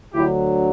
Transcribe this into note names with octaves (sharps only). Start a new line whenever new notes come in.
D2 D3 F#3 E4 G4